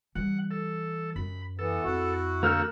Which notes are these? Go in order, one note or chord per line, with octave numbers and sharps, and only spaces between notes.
E3 G3 F#5
A4
F#2 B5
E3 B3 A4
F2 E4 F#4
D3 A#3 F#4 E6 F6 G6